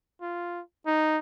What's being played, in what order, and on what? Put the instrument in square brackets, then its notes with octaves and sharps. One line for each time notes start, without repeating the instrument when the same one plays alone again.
[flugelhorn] F4
D#4